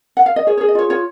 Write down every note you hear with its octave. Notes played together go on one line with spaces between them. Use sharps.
F#5
F5
D#5
G#4 C#5
C#5
G#4
D#5
F4 C#5
F4 C#5